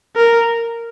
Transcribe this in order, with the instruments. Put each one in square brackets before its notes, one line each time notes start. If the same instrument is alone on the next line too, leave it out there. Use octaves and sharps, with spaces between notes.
[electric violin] A#4